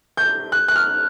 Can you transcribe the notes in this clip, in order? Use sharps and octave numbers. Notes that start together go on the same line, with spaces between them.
G6
F#6
F#6
F6